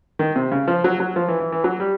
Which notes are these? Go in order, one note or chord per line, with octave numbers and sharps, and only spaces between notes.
D#3
C3
C#3
F3
F#3
F#3
F3
E3
E3
E3
F#3
G3